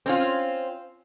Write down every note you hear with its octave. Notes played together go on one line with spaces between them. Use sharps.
C4 C#4 F4